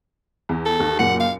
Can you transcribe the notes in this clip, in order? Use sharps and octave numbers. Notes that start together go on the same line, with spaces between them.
E2
A4
D#2
F#1 A#2 F#5 C#7
F5